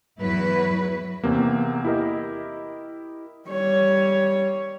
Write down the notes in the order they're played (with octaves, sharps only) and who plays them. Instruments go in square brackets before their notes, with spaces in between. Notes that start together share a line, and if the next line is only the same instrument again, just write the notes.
[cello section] E2 F#3 E4 B4
[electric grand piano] E2 C3 A#3
E4 G4 A#4 D#5
[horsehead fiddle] G3 C#5